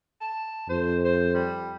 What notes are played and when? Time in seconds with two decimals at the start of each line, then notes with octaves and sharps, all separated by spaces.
0.21 A5
0.69 F2 C5
1.05 C5
1.34 G3